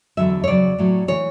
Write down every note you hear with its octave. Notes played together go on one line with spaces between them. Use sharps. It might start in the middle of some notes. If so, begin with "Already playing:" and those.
E2 D3 F#3 E5
C#5
E2 C#3 F#3 D5
A2 F#3
C#3 E3 C#5